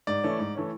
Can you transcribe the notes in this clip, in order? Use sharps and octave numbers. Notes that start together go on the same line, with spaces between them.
G#2 D5
E3 A3 C#4
G#2
E3 A3 C#4